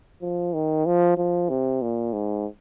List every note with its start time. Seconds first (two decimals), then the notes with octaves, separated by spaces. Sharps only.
0.22 F3
0.54 D#3
0.86 F3
1.17 F3
1.50 C3
1.82 A#2
2.13 G#2